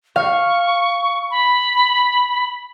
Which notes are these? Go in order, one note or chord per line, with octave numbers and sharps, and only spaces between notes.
F5 C#6
B5